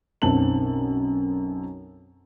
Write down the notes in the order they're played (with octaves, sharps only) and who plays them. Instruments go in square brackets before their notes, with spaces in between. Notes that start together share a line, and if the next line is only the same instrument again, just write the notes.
[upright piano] B1 F#2 C4 A5 F#7